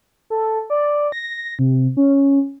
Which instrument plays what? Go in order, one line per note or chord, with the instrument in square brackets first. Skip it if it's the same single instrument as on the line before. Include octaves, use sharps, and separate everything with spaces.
[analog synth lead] A4
D5
A#6
C3
C#4